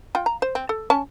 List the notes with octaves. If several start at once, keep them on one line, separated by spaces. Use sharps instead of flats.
F4 G5
A#5
C5
C4
A4
C#4 A5